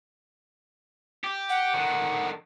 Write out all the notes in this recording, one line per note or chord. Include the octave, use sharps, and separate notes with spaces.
G4
F#5
D3 D#3